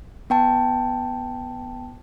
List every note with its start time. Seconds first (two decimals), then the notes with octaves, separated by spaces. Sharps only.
0.30 B3 G5 A5